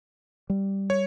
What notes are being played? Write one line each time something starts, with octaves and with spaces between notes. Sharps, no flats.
G3
C#5